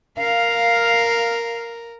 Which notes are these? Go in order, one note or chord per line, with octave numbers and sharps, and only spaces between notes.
A#4 F5